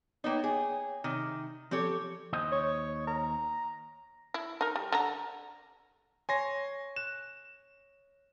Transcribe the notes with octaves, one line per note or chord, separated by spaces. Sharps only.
A#3 B3 D#4 C#5 G5
G#4
C3 D#3
F3 C4 G4 A4 C#5
D#2 C5 D#5
C#5
A#5
E4
D#4 A#4
G3
D3 A#5
C#5 G#5 C6 A#6
F#6 E7